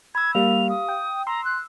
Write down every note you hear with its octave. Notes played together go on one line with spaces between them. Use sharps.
B5 E6 G#6
G3 A#3 G4 F5 F7
D#6
G5
A#5 C6 E6
F#6